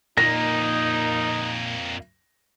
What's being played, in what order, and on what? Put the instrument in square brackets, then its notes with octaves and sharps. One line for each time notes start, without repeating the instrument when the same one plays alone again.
[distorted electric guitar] F2 A#3 [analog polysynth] A#2 [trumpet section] D#4 [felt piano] A#6